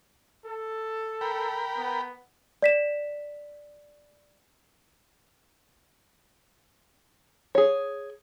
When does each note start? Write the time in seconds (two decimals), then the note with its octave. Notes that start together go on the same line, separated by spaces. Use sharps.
0.46 A4
1.21 A#4 G5 B5
1.78 B3
2.62 D5 B6 E7
7.55 G#4 C#5